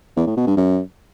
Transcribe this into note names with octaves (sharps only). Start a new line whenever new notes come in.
E2
A2
B2
G2
F#2